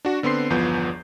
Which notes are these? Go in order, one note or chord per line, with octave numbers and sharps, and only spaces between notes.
D4 F#4
D3 B3 C4 C6 C7
G1 E2 F3 B3 G6